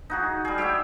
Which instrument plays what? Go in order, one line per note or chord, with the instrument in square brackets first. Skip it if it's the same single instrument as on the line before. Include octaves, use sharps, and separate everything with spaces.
[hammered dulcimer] D#4 F#4 G#4
G3 G#4
G4 C#5 E5 G5